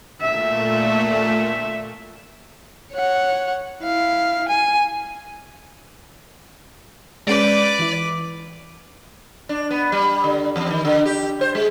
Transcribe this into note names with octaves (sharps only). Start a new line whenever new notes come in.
A#2 A3 E5
C#5 F#5
E4 F5
G#5
G#3 C#4 B4 D5 D6 G6
E3 E4
D4
B3
G3
D3
E2
D#3
D3
G4
C5
G#3